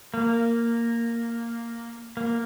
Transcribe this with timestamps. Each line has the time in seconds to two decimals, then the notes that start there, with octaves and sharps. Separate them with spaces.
0.14 A#3
2.17 A#3